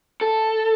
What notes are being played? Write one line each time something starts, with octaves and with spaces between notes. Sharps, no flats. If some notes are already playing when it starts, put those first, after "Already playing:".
A4